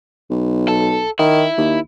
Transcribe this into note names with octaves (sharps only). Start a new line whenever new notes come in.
B1
A4
D#3 E4
D#2